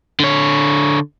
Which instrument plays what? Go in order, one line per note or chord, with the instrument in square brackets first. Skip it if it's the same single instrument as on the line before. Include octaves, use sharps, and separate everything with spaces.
[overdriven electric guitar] D3 C#5